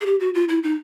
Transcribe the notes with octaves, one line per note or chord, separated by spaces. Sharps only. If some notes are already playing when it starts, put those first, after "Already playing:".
G#4
G4
F#4
F4
E4
D#4